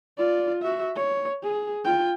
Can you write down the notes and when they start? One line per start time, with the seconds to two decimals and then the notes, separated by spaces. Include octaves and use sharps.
0.18 F4 D5
0.62 F#4 E5
0.96 C#5
1.42 G#4
1.84 F4 G5